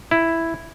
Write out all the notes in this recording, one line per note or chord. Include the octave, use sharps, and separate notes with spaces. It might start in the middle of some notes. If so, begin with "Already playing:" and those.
E4